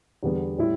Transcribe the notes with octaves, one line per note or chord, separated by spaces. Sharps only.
E2 D3 G3 B3
A2 G3 E4